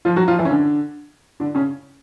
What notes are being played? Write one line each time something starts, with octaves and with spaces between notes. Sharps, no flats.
F3 F4
F#3 F#4
F3 F4
E3 E4
C#4
D3 D4
D3 D4
C#3 C#4